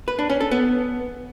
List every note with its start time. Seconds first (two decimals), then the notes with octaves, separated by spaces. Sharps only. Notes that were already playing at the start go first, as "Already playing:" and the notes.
0.08 B4
0.19 D4
0.30 C#4
0.40 A4
0.51 B3